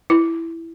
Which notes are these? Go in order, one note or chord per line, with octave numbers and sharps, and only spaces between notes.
E4